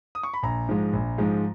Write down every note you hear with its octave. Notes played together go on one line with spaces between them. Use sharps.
D#6
C#6
B5
A#1 A#5
G#2 F3 G#3
A#1
G#2 F3 G#3